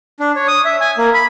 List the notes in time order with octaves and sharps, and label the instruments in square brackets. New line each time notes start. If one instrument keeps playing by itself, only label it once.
[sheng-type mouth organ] D4
C#5
D#6
E5
G#5
A#3
B5